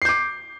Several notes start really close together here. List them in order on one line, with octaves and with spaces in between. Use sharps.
C7 G6 D6